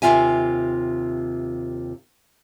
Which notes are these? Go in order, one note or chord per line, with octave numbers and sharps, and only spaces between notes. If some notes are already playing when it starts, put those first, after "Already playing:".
D#2 C3 D#4 F4 E5 G#5